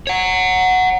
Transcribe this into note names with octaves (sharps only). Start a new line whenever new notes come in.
C#5 F#5